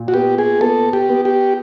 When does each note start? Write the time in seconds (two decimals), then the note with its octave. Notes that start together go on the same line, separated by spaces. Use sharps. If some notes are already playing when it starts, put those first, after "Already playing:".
Already playing: A#2
0.08 F#4
0.14 B3 G4
0.38 G#4
0.61 B3 A4
0.93 G4
1.09 B3
1.25 G4